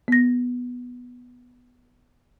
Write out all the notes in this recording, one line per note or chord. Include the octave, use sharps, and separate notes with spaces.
B3 A#6